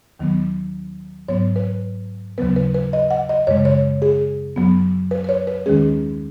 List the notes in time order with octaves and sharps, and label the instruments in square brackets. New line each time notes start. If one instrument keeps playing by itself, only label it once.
[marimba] D#2 D#3 F#3 B3
G#2 F#3 B3 C#5
B4
D#2 C#3 F#3 B3 B4
B4
B4
D#5
F#5
D#5
F#2 C#3 G#3 C#5
C#5
G#4
F#2 F#3 B3
B4
B4
C#5
B4
D#2 D#3 G#3 C#4 G#4